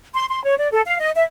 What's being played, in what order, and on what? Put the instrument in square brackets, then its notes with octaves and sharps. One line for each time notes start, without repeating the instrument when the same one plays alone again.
[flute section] C6
C6
C#5
D5
A4
F5
D#5
E5